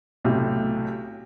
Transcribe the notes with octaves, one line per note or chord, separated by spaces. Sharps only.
B1 A2 C3